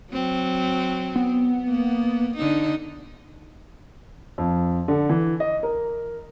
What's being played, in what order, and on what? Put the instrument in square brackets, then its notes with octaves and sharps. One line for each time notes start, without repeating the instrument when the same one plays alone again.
[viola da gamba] F#3 C4
[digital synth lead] B3
[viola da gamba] A#3
D3 D#4
[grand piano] F2
D3
E3
D#5
A#4